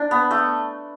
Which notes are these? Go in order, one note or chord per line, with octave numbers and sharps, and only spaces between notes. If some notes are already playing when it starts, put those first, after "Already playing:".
Already playing: D4
B3
A3